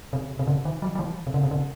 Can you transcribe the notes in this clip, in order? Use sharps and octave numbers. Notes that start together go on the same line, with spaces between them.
C3
C3
C#3
D#3
F#3
F#3
E3
C3
C#3
C3
C#3